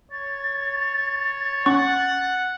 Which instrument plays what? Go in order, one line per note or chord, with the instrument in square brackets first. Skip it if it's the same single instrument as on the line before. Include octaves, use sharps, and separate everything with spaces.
[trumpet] C#5 [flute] A6
[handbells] C#4 C#6 [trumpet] F#5